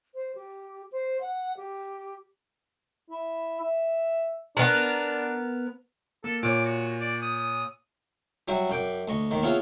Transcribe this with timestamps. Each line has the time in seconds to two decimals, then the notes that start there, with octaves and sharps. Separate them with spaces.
0.15 C5
0.35 G4
0.92 C5
1.21 F#5
1.57 G4
3.10 E4
3.60 E5
4.57 B3 D4 A#4
6.24 A#3 A4
6.43 A#2 C#5 D6
6.65 F#4
7.01 D5
7.22 D#6
7.36 D#6
8.48 F#3 G3 E4 F#4
8.70 F#2 G5 D6
9.08 D2 D#5 C#6
9.31 D#2 D#3
9.42 B3 C#4 E4 F4 G#4 B4